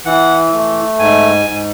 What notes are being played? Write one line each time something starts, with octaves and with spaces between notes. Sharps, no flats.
E3 F#5
A3
G#2 G#5
G#2